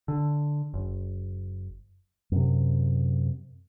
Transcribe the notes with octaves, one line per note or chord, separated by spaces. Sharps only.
D3
F#1
F#2 C3